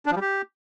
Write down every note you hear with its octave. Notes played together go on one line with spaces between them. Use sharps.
D4
F3
G3
G4